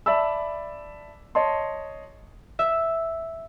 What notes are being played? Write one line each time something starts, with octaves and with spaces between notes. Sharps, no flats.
D5 E5 A5 B5 E6
C#5 D#5 A5 C6
E5